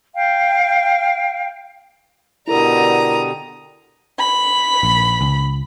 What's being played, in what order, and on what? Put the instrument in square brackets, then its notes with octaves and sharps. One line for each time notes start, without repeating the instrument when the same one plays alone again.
[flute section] F5 G5
[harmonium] B2 D3 G3 [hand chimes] E4 A4 A#4 [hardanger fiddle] A#5 D#6
[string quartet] B5
[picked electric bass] A#1
C#2